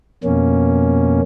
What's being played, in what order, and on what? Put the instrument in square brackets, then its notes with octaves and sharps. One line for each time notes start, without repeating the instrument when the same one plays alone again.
[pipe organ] F2 B2 A#3 C#4